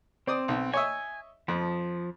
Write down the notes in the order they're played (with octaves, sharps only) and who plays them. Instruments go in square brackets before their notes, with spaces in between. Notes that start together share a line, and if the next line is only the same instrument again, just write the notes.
[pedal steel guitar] C4 [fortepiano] C5 D5 D#6
[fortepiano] B1
[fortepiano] C#5 D#5 E5 [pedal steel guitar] G#5
[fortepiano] F2 [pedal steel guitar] F3